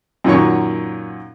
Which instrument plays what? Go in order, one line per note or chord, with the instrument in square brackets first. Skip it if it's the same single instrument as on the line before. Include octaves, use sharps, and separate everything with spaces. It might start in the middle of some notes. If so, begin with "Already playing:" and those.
[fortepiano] F#2 A#2 D#3 F#4 C#5 C#6